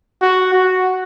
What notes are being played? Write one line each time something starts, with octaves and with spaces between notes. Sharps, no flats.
F#4
F#4